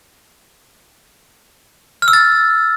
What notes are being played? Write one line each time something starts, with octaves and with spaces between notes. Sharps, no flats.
F6
E6
A6